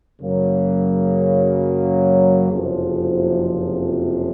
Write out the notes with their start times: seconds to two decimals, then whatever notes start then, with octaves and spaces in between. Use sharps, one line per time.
0.22 F#2 C#3 F#3 A#3
2.50 F#1 F2 C3 F3